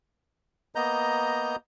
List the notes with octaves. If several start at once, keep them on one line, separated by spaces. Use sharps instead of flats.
A#3 B3 D#5 A#5 G6